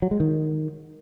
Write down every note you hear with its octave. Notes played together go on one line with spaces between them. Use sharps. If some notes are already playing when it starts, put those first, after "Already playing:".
F#3
G#3
D#3